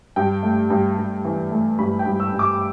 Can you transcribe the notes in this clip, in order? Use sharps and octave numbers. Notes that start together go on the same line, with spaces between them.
G2 G5
A3
G2
G2
E3
A3
G2 B5
G5
G2
E6
G2
D6